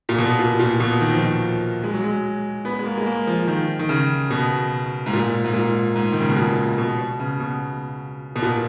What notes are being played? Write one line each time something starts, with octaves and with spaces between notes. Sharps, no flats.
A#2
B2
A#2
A#2
B2
D#3
F3
D#3
G#3
F#3
G#3
B3
G#3
A#3
G#3
A#3
F3
D#3
D#3
C#3
B2
G#2
A#2
G#2
A#2
G#2
D#3
C#3
B2
A#2
B2
B2
C#3
B2
B2
A#2